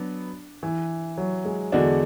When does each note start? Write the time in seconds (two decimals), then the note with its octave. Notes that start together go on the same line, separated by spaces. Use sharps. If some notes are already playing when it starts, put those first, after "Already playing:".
Already playing: F#3 B3 D4
0.63 E3
1.18 F#3
1.45 G#3
1.72 E2 D3 G#3 D4 F#4